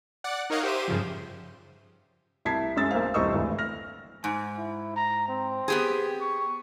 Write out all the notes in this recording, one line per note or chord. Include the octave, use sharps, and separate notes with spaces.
D5 F#5
D#4 A#4 C#5 D#5 F5 F#5
G4 C5 E5 D#7
G2 C#3 F3
C2 E4 A5 G#6 B6 C7
F#2 G#3 C#4 E5 E6 A6
B1 A#3 C5 F5
D#1 C2 C5 D#5 C#6 E6
G#1 D2 E3
F6 A#6
G#2 G#5
E4
A#5
C4
B3 G4 G#4
C#6